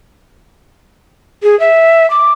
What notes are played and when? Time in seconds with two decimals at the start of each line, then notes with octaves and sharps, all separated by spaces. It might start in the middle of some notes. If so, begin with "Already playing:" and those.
1.43 G#4
1.60 E5
2.11 D6